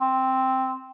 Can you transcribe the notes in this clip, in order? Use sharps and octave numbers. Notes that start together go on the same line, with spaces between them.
C4